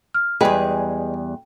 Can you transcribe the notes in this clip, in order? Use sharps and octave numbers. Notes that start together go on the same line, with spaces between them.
F6
E2 G3 G#3 G#4 B4 G5